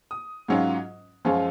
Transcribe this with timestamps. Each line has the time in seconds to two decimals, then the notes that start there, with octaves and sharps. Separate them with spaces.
0.11 D#6
0.48 G#2 F#3 C#4 F4
1.25 F#2 F3 G#3 C#4 F4